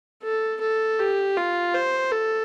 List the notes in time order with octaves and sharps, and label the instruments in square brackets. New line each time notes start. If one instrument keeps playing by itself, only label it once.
[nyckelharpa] A4
A4
G4
F4
C5
A4